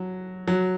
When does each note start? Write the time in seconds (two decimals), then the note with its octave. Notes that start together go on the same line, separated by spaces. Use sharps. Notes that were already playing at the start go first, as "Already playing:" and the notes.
Already playing: F#3
0.48 F#3